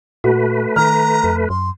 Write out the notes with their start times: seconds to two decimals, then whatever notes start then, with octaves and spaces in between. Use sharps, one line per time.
0.24 A#2 A3 F#4 B4
0.76 D#3 A#5 F6
1.24 F2
1.50 F#2 C6